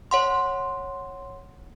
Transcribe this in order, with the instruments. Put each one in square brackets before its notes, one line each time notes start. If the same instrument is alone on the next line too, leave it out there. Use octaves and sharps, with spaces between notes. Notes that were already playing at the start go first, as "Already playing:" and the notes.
[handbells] C#5 F#5 C6